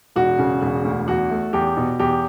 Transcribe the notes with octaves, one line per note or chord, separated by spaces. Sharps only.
E1 F#4
C#3
E1
D2
E2 F#4
A3
E2 G4
B2
E2 G4